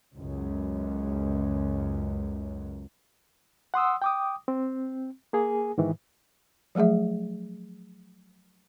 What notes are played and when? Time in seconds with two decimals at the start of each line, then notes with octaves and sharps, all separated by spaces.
0.16 C#2 F#2
3.74 F#5 C6 D#6 E6
4.02 G5 D6 D#6
4.48 C4
5.33 A#3 G#4 G#5
5.78 G#2 D#3 E3
6.75 F3 F#3 A3 G#4 E5